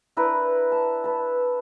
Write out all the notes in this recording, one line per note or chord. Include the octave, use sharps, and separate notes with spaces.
D4 E4 A#4 B4
A5
B4 A5